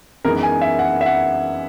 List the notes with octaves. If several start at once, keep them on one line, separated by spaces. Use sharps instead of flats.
F#2 E3 G#3 B3 D#4 A#4
G#5
E5
F#5
E5
F#5